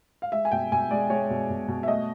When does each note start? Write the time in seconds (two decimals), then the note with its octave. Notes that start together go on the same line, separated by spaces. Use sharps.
0.22 F5
0.32 G#3 E5
0.45 G#5
0.51 B2 G5
0.72 B2 G#5
0.91 G#3 D5
1.10 G#3 C#5
1.30 B2
1.50 B2
1.68 B2
1.83 E5
1.88 A3 D#5